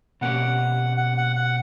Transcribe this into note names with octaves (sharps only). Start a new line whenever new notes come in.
B2 A#3 C#4 G4 F#5
F#5
F#5
F#5